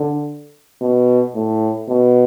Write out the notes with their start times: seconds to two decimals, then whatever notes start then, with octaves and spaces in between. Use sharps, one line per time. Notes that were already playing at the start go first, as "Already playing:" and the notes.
Already playing: D3
0.82 B2
1.35 A2
1.89 B2